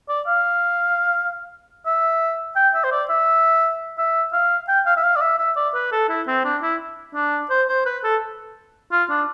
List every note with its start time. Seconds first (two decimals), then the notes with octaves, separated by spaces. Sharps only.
0.09 D5
0.27 F5
1.86 E5
2.56 G5
2.74 E5
2.84 C5
2.92 D5
3.09 E5
3.98 E5
4.33 F5
4.68 G5
4.86 F5
4.97 E5
5.03 F5
5.16 D5
5.21 E5
5.39 E5
5.56 D5
5.74 B4
5.92 A4
6.09 E4
6.27 C4
6.44 D4
6.62 E4
7.15 D4
7.50 C5
7.69 C5
7.86 B4
8.04 A4
8.92 F4
9.10 D4